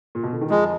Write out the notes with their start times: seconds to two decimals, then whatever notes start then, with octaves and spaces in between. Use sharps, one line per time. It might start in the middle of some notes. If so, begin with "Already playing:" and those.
0.15 A#2
0.23 B2
0.33 D3
0.41 D#3
0.50 F2 F3 G#3